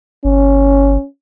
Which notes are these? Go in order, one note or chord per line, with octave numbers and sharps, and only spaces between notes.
G1 C#4